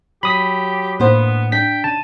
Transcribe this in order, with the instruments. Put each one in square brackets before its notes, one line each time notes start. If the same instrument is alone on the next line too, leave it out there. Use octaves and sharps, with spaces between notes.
[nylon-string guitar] F#3 [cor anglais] G4 [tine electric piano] B5 D#6 B6
[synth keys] A2 A#3 F#5 [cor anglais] B3 [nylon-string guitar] D4 C5
[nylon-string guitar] D4 [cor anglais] G5 [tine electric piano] B6
[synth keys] C#3 D#7 [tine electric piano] A5